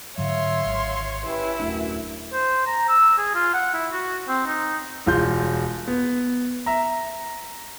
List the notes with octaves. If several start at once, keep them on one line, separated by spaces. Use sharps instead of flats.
G#2 D3 F#3 C#5 E5 F5 C6
G#1
C#4 E4 G4 B4
D#1 F#2 A3 D4
C5
A#5
E6
G#4
F4
F#5
E4
F#4
C4
D#4
E1 F4 G6
B3
E5 A#5